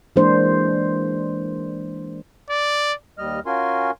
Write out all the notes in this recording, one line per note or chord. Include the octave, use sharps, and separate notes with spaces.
E3 G#3 A#3 D4 C5
D5
D#2 G3 D#5 F6
C#4 F4 F#4 A#4 G#5 C6